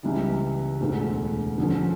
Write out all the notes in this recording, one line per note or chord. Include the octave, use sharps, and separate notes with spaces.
C#2 C#3 E3 G3
E1 D2 D3
D3 F3 C#4